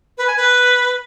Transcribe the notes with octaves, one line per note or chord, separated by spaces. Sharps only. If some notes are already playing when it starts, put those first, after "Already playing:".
B4
G#5
B4